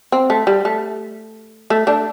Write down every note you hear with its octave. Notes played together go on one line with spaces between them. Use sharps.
C4
A3
G3
A3
A3
A3 D4